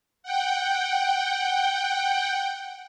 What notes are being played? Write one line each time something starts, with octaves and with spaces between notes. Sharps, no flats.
F#5 G5